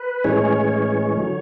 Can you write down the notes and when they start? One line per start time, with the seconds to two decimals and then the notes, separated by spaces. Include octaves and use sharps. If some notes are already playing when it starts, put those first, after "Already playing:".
Already playing: B4
0.24 A2 E3 G#3 C#4 C#5
1.17 D3 F#3